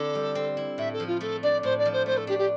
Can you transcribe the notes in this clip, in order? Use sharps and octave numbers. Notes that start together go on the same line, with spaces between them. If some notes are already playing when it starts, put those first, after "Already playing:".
Already playing: D3 C4 E4 A4
G3
C4
E4
A2 E5
A4
F3
F4
A3 A4
D4 D5
A2 C5
D5
F3
C5
A3 C5
A4
D4 G4
G4